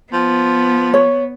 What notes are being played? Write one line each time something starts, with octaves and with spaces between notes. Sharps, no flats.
F3 B3
C#5